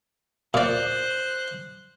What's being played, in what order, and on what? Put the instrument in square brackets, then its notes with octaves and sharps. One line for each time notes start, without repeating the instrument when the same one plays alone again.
[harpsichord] A#2 D5 [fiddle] C5 F#6